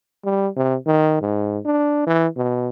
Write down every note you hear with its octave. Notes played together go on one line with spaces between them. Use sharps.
G3
C3
D#3
G#2
D4
E3
B2